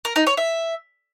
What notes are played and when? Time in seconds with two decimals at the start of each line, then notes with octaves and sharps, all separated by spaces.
0.05 A#4
0.16 D#4
0.27 C#5
0.37 E5